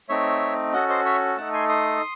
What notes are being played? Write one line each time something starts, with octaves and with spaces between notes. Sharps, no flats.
A3 C4 D#4 C#5 E5
C#4 F#4 A4 D#5 F#5
C5 D#5
C#5 E5
A3 D#4 A4 F#5 A5
G#5 C6
C6 D#6